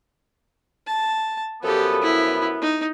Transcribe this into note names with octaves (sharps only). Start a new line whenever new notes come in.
A5
F#2 F3 B3 G4 A4
E4
D#4